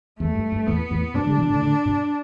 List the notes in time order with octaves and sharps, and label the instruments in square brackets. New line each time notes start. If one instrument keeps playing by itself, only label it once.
[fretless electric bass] E2 [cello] A3
[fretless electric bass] G2
G2
[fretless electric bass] E2 A2 [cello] B3
[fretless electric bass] E2 A2
[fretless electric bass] G2 B2 [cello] D4
[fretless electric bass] D3 G3
B2 E3
A2 D3
A2 D3
G2 B2